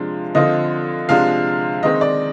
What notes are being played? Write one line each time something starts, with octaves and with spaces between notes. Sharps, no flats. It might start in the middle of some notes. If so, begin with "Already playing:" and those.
Already playing: C3 F3 G#3 D4 F4
D3 F3 C4 F4 D#5
C3 F3 G#3 D4 F4 F5
D#3 G#3 C4 D#5
D5